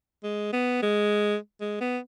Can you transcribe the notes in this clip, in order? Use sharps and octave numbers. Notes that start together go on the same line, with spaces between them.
G#3
B3
G#3
G#3
B3